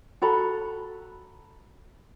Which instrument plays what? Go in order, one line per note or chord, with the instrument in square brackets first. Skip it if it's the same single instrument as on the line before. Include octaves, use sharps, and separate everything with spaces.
[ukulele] F#4 A4 A#5 B5